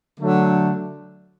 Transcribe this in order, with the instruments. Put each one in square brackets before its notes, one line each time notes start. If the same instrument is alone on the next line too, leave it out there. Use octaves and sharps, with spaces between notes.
[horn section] D3 F#3 A3